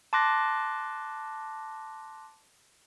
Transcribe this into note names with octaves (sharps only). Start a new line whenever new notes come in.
A5 C6 D6 F#6 A#6